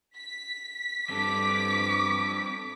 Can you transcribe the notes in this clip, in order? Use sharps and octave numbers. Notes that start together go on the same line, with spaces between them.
B6
G2 C4 A4 D6